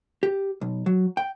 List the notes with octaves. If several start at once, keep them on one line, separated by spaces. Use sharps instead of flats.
G4
B1
F#3
G5